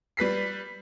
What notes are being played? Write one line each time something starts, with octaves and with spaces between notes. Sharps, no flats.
G3 B4 B6 C7